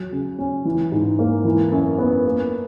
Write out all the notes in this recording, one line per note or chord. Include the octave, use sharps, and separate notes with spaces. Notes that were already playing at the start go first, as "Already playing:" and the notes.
Already playing: F#3
C#3
C#4
E3
G#2
A#3
E3
F#2
B3
A#3